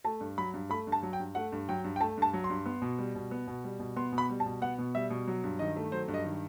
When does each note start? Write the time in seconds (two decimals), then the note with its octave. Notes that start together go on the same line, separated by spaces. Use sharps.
0.04 A3 A5
0.21 G2
0.38 F#3 B5
0.54 G2
0.70 A3 B5
0.87 G2
0.92 A5
1.03 F#3
1.13 G5
1.20 G2
1.35 A3 F#5
1.52 G2
1.69 F#3 G5
1.84 G2
1.96 G5
2.00 A3 A5
2.17 G2 A5
2.34 F#3
2.44 C6
2.50 G2
2.66 B3
2.82 B2
2.99 G3
3.15 B2
3.31 B3
3.48 B2
3.64 G3
3.80 B2
3.96 B3 C6
4.12 B2
4.18 B5
4.30 G3
4.40 A5
4.46 B2
4.62 B3 F#5
4.78 B2
4.95 G3 E5
5.10 B2
5.27 F#3
5.44 G2
5.59 D#3 D#5
5.76 A3
5.92 F#3 C5
6.08 G2
6.14 D#5
6.25 D#3